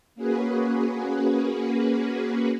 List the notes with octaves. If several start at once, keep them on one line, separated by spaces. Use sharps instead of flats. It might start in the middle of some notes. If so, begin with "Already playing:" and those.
A#3 C#4 F#4 G#4 B4